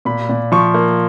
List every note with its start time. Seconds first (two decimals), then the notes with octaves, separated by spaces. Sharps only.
0.05 A#2 B5
0.29 A#2
0.52 F3 C#6
0.74 A#3